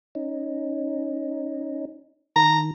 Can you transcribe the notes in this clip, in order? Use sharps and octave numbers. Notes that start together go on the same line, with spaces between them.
C#4 D#4
D#3 A#5